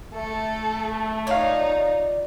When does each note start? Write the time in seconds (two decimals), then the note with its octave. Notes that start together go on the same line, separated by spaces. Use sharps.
0.14 A3 A4
1.27 D#4 F4 C#5 D5 F5